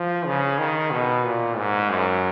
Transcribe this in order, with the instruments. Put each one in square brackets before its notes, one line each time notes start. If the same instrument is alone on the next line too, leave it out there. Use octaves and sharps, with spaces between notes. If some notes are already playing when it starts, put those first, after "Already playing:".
Already playing: [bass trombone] F3
C#3
D#3
B2
A#2
G#2
F#2